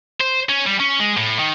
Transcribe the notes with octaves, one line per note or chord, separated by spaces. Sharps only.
C5
C#4
G3
C#4
G#3
A2
D#3